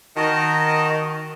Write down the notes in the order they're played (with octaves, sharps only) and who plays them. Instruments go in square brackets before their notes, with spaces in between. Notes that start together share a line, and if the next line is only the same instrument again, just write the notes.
[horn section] D#3 [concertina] F#4 D#5 A5